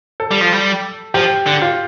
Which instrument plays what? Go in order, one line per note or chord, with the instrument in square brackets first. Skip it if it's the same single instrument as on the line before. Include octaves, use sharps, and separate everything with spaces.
[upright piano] A4
[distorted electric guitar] G3
F3
G3
[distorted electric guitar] F3 [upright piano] G4
[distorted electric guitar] D3
[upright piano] F4